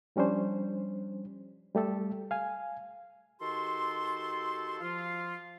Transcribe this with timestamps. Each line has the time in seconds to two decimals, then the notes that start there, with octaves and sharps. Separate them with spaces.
0.16 F3 G3 C#4 D4 C5
1.75 G3 A3 G4 A4
2.31 F5 G#5
3.40 D#3 F#4 G4 A4 C6
4.80 F3 F4